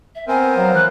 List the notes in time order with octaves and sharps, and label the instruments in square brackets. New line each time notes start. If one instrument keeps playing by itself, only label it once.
[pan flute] E5
[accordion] B3 A#4 C5 [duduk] C4 [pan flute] G#5
[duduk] F#3 [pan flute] F5
[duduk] E3 [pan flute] F#6